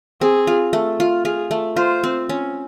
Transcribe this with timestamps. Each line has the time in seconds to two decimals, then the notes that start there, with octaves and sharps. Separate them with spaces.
0.21 C4 G#4
0.47 F4
0.73 A3
1.00 F4
1.25 F4 G#4
1.51 A3
1.76 F4 C5
2.04 C4
2.29 C#4